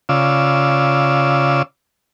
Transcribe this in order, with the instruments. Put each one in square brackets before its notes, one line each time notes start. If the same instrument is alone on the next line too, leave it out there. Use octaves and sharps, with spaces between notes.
[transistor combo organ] C#3 F4 D5 E6